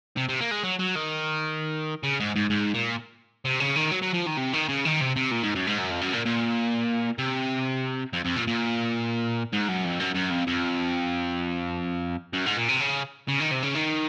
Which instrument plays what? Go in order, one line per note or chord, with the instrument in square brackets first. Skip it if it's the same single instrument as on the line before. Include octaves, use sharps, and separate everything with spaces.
[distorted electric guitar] C3
C3
A#3
G#3
F#3
F#3
D#3
C#3
G#2
G#2
G#2
A#2
C3
C#3
D#3
F#3
F#3
F3
D#3
C3
D#3
C#3
D#3
C3
C3
A#2
G#2
F#2
G#2
F#2
F2
F#2
A#2
A#2
C3
F2
F2
A#2
A#2
G#2
F#2
F2
F#2
F#2
F2
F2
F#2
G#2
A#2
C3
C#3
C#3
D#3
C3
C#3
D#3